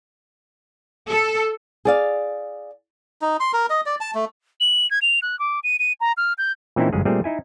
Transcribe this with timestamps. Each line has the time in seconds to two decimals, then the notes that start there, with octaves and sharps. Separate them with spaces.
1.08 A4
1.85 G#4 D5 F5
3.22 D#4
3.40 C6
3.53 A#4
3.70 D#5
3.86 D5
4.01 A5
4.15 A3
4.60 F#7
4.91 G#6
5.02 F7
5.22 F#6
5.39 D6
5.64 D#7
5.79 D#7
6.00 A#5
6.17 F6
6.38 G6
6.76 A#2 E3 C4 C#4 D#4 E4
6.92 G1 F#2 G#3 C#4 G#4
7.05 A#2 G3 A3 C4 G#4
7.24 D#4 E4 G#5